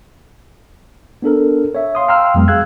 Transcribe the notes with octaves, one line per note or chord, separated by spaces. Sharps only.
B3 D4 A4 A#4
C#5 E5
F5 C6 D#6
F5 G5 A#5 C6 E6 F6
F2 F#3 G#3 B3
G#4 F5 E6 F#6 G#6